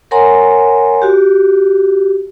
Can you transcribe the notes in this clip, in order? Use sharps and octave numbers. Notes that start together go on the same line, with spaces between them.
A#4 C#5 F#5 G#5 A#5 C6
F#4 G4